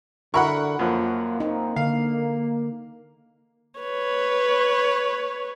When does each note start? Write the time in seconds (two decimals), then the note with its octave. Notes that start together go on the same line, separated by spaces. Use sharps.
0.34 D3 E4 A#4 F#5 B5 C#6
0.79 F#2 F3 A#3 F4
1.40 A#3 C4 D#4
1.76 D3 A#3 F5
3.79 B4 C#5